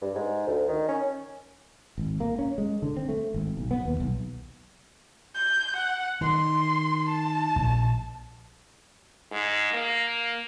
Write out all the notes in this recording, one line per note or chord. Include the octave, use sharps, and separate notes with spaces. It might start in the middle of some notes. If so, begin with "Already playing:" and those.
G2
G#2
D2
D#3
C#4
G#1
A#3
C#4
G#3
D3
C4
A3
G#1
B1
B3
D#2
B1
G6
F#5
D#3 C6
A5
A#1
G#2
A#3